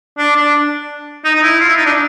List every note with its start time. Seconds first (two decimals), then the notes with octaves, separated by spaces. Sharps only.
0.18 D4
0.36 D4
1.25 D#4
1.35 D#4
1.42 E4
1.60 F4
1.68 E4
1.77 D#4
1.86 D4